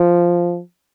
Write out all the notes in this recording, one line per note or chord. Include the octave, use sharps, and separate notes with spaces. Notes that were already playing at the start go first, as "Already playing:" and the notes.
Already playing: F3